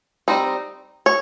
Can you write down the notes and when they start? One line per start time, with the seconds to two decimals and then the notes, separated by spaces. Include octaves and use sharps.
0.28 G3 C4 D#4
1.06 C#5